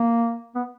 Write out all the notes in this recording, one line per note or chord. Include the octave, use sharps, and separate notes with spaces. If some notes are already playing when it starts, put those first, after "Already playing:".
Already playing: A#3
B3